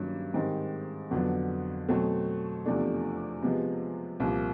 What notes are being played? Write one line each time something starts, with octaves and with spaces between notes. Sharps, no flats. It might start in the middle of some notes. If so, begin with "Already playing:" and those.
Already playing: G2 D#3 F#3 A#3 C#4
G#2 D#3 G3 C4
F2 D3 F#3 B3
B2 F#3 A3 C4
E2 C3 F3 A3 D4
C3 F3 G#3 B3
C2 A#2 F3 A#3